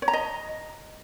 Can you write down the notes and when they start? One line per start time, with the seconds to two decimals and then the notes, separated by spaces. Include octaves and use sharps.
0.02 C#5
0.08 A#5
0.13 D#5